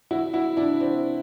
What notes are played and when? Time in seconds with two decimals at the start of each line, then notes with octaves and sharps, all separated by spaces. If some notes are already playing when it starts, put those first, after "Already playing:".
0.11 E4 F#4
0.33 E4 F#4
0.57 D4 E4
0.80 C4 D4